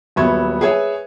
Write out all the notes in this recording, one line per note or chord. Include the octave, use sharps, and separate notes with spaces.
D#1 F#3 B3 E5 C#6 G#6
G#4 B4 C#5 E5 G#5